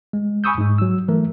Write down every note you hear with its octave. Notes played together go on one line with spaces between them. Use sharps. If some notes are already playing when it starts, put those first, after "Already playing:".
G#3
G#5 B5 C#6 D#6 E6 G6
G#2 G#3
F#3 E6
E3 A3 A#4